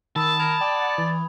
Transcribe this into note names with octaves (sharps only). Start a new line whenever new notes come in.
D#3 A5 B5 D#6 E6
A#4 B5 G#6 F7
D5 G5
F#5
E3